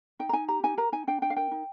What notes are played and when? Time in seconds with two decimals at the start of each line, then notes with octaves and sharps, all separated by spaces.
0.19 D#4 G5
0.29 A#5
0.33 D#4 G#5
0.48 G4 A#5
0.63 D#4 G#5
0.78 A#4 A#5
0.92 D#4 G#5
1.07 D4 G5
1.22 D4 G5
1.30 F5
1.36 A#4 G5
1.51 D#4